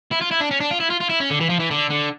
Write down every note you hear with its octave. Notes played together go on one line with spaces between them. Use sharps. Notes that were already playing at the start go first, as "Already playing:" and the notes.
E4
F4
E4
D4
C#4
D4
F4
E4
F4
F4
E4
C#4
D3
E3
F3
E3
D3
D3